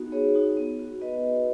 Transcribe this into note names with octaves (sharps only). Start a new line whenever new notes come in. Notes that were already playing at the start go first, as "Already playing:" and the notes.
Already playing: B3 D#4 F#4
B3 G#4 C#5
D#4 F#4
B3
F#4
B3 B4 D#5